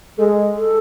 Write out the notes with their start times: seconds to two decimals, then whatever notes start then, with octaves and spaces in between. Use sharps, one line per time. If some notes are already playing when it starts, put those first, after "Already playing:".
0.18 G#3 A4
0.54 A4